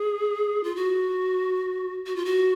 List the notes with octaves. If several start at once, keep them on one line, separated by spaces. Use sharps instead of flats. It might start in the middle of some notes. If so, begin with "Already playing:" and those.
Already playing: G#4
F4
F#4
F#4
F4
F#4